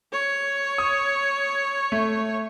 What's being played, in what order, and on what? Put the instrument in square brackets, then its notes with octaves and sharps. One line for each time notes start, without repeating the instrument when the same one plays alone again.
[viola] C#5
[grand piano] D#6
A3